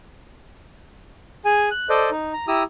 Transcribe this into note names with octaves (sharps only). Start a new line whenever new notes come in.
G#4 G#5
F#6
A4 C5 D5 D#5
D#4
A#5
E4 G4 A#5 D#6 E6